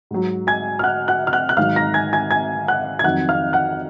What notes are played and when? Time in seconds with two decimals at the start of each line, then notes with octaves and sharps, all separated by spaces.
0.11 G#2 F#3
0.47 G#5 G#6
0.79 F6
0.83 F#5 F#6
1.08 F#5 F#6
1.27 F6
1.33 F#5 F#6
1.49 F#6
1.57 G#2 D#3 F#3 F5 F6
1.76 A#5 A#6
1.94 G#5 G#6
2.13 G#5 G#6
2.31 G#5 G#6
2.68 F#5 F#6
2.99 G#6
3.04 F2 D#3 F#3 F#5 F#6
3.29 F5 F6
3.53 F#5 F#6